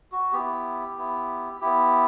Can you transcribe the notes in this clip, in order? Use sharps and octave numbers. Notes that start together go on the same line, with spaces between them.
F#4
B3 E4 G4
B3 E4
B3 E4 G4